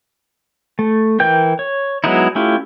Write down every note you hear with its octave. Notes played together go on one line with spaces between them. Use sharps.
A3
E3 A#4 G5 G6
C#5
F#3 G#3 B3 D#4 E4
A3 C#4 E4 F4 G4